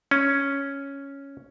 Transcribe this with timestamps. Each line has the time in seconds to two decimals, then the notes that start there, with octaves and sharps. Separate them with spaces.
0.11 C#4